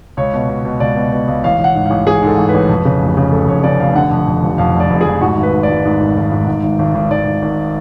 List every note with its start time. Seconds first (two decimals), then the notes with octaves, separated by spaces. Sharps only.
0.17 C#2 C#5
0.34 B2
0.49 B2
0.65 B2
0.80 C#2 D5
0.96 B2
1.12 B2
1.28 C#2
1.44 A1 F5
1.59 A1
1.64 F#5
1.75 G#2
1.86 A1 F5
2.07 A1 G#4
2.23 G#2 A4
2.38 A1
2.49 B4
2.54 A1
2.69 F2
2.85 C#3
3.02 F1
3.17 C#3
3.32 F1 A4
3.48 F1 C#5
3.64 C#3 D5
3.80 F1 F5
3.95 D3 F#5
4.11 F2
4.28 F2
4.43 F1
4.58 F2 F5
4.75 F1
4.80 D5
4.90 F1
5.01 G#4
5.06 F1
5.21 G#2 F#4
5.37 G#1
5.43 B4
5.53 G#2
5.63 D5
5.69 G#2
5.85 G#2
6.00 G#1
6.17 G#1
6.32 G#2
6.48 G#2
6.63 G#1
6.79 G#1
6.95 G#1
7.10 G#1 D5
7.27 G#1
7.42 G#1